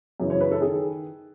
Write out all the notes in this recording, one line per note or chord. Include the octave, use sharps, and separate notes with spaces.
F#2 C#3 E3
C#5
B4
A4
D#3 G#4